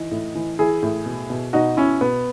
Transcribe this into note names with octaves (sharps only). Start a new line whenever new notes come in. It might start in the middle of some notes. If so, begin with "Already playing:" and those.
Already playing: E3 D#4
A2
E3
E3 E4 G#4
A2
B2
B2
B2 D#4 F#4
B2 C#4 E4
B2 B3